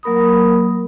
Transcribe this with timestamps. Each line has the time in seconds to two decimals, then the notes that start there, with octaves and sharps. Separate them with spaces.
0.03 F#3 A#3 A#4 B5 D#6